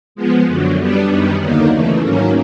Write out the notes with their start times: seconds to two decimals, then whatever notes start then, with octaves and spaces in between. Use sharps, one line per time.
0.15 F3 G#3 B3
0.47 F#2 D3 F#3
0.78 G3 B3 D4
1.09 F#2 D#3 G3 B3
1.41 D#2 D3 F#3 A#3 D#4
1.72 C#3 E3 A3
2.03 G#2 D#3 F#3 A#3 C#4